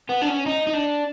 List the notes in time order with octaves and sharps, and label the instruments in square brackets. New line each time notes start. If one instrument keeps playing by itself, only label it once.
[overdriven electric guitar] B3
D4
C#4
D#4
D#4
D4